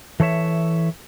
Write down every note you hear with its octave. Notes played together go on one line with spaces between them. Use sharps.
E3 A4 C#5 E5